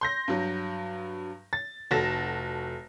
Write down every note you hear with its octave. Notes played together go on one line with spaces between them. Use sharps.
C6 G6 A#6
G2 F#3
A6
F1 F#4 A4 A6 A#6 E7